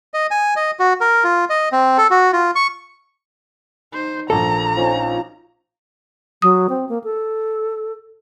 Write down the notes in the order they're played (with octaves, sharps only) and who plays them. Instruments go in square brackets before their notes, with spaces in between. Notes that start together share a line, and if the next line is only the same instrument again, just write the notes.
[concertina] D#5
G#5
D#5
F#4
A#4
F4
D#5
C4
A4
F#4
F4
C#6
[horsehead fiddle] D#4 C5
[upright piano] A#1 A#2 [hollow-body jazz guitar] A4 [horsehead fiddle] A#5
[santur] F3 C#4 D#4
[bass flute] F#3 [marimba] D#6
[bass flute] C4
A#3
A4